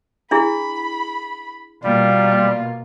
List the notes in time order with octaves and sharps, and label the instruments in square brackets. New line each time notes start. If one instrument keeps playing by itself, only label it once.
[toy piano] D4 E4 G#4 [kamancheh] B5
[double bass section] B2 A#3 [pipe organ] G3 [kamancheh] F4